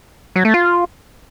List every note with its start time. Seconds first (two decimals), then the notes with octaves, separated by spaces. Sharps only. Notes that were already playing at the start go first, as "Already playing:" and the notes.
0.36 F#3
0.45 A3
0.54 F4